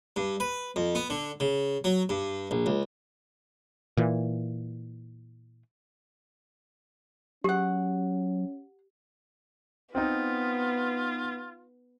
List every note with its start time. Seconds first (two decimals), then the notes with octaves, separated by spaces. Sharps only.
0.16 G2
0.40 B4
0.76 F2
0.95 B3
1.10 D3
1.40 C#3
1.84 F#3
2.09 G2
2.51 A#1
2.66 C#2
3.97 A#2 E3
7.44 F#3 C#4 G4 G#4 F#5
9.95 B3 C4 D#4 F4